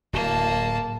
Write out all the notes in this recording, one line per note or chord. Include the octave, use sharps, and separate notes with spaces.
D1 A#3 A5